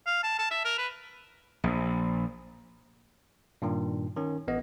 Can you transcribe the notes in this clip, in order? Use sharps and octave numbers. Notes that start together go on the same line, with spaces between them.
F5
A5
A5
E5
A#4
B4
A#1
G2 A#2 D#3
D#3 C#4
A1 B3 D#5